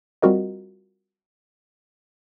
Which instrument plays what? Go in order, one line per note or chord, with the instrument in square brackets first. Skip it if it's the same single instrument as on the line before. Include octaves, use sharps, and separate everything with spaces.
[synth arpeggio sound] G3 C4 F4 F#4 A#4 D#5